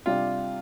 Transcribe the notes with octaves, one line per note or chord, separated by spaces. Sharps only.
C3 G3 D4 F4 G4